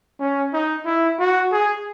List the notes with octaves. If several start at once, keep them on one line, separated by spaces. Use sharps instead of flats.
C#4
D#4
E4
F#4
G#4